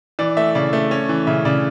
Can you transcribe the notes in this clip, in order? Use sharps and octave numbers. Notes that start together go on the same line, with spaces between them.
E3 D5
A3 E5
C#3 D5
A3
C#4
E3
C#3 E5
C#3 D5